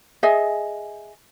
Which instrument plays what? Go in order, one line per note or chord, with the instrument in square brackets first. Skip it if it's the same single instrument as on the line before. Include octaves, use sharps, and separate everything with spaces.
[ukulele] G#4 D#5 E5